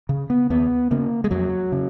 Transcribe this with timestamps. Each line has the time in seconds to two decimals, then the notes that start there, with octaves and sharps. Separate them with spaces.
0.09 C#3
0.30 B3
0.50 D#2 B3
0.91 C#3 A#3
1.24 G#3
1.31 F2 F#3
1.72 C#3